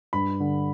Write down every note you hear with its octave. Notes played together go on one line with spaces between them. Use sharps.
G2 B5
D3